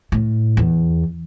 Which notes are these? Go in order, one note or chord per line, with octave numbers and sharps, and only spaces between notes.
A2
E2